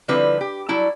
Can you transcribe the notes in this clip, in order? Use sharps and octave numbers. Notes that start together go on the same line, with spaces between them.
D3 F3 G3 C4 E4 B4
G4
F#3 G3 E4 A5